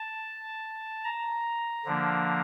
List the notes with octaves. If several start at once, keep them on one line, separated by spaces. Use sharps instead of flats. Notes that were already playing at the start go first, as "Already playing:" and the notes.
Already playing: A5
A#5
D3 F3 A#3 D4